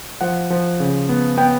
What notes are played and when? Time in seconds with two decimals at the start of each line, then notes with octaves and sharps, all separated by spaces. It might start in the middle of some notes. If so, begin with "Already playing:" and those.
0.21 F3 F#5
0.50 F3
0.80 C#3
1.09 B3
1.37 B3 G5